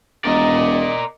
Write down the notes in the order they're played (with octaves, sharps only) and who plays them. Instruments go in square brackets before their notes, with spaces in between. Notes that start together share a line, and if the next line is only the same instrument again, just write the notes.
[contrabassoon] E1 [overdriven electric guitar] A#4 D5 [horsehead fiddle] D#5